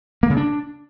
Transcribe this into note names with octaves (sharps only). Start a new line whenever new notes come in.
A#3
C#3
D4